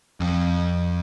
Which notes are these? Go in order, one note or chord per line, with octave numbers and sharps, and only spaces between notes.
F2